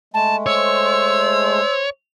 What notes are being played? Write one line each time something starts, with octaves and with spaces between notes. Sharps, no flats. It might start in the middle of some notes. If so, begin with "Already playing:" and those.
G#3 A3 A5
C5 C#5 E6